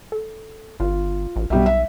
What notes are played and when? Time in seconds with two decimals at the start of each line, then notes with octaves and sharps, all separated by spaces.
0.12 A4
0.80 G1 F4
1.36 A1
1.50 B1 B2 G3 E5
1.66 E5